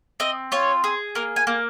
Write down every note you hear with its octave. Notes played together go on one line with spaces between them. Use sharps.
C4 D#5
F4 C#5
G#4
A#3 A#4
G#5
A#3